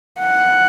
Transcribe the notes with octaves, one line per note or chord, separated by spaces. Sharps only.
F#5